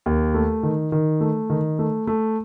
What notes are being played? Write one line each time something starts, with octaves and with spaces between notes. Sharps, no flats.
D#2
A3
D#3
D#3
A3
D#3
A3
A3